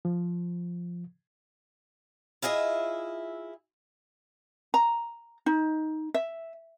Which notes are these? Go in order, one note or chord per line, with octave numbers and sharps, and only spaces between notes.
F3
E4 F4 G#4 D#5 E5
A#5
D#4
E5